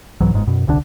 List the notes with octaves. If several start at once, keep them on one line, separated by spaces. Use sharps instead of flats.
C2 G#2 E3 F#3
G1 G#2 G#3
F#2 B2
D#1 C2 D3 D4